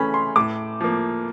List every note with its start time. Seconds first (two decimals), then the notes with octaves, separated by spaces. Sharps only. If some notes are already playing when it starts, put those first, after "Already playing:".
Already playing: C#3 E3 A3 C#4 B5
0.14 C6
0.36 A2 D6
0.81 F3 A#3